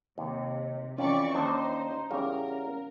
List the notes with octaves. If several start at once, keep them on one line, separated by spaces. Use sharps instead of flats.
D#2 C3
F2 E3 C#4 D5 C#6
D#2 D4 D#4 C5
E2 C#3 G3 C#4 A#4 F5